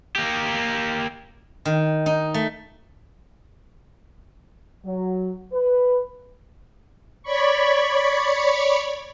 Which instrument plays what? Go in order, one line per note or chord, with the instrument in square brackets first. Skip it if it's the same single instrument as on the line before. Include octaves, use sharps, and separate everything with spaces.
[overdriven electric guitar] A#3 G4
[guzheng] D#3
D#4
A3
[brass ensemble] F#3
B4
[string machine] C#5 D5 B5 C#6